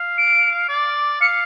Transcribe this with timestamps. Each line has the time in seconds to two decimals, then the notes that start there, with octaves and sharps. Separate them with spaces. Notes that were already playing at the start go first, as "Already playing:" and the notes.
Already playing: F5
0.17 D7
0.69 D5
1.21 F5 C#7